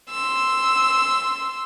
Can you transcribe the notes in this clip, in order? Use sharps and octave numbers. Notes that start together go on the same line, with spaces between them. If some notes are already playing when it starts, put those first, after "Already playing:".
C6 E6